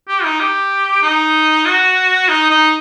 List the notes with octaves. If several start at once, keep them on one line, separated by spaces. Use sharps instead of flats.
G4
D#4
G4
D#4
F#4
D#4
D#4